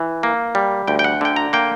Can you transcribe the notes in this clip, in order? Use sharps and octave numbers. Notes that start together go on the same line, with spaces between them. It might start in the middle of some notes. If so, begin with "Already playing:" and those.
Already playing: E3
A#3
G3
D2 G5
G5
F#5
D3 G5
A#5
A#3 G5